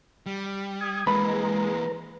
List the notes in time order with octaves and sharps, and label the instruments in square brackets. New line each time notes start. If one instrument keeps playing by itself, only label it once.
[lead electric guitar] G3
[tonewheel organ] D#6 G#6
[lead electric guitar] E3 A#3 [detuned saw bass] G#3 [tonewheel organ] B4 A#5 [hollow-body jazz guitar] B5